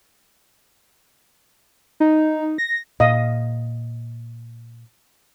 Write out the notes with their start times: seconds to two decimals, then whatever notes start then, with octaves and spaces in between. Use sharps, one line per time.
2.00 D#4
2.58 A#6
3.00 A#2 D#5 F5 D#6